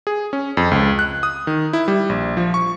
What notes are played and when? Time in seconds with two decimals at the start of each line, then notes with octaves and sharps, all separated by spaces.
0.07 G#4
0.33 C#4
0.57 F2
0.71 C#2
0.99 F#6
1.23 D#6
1.47 D#3
1.73 E4
1.88 G3
2.09 A#1
2.37 F3
2.54 C#6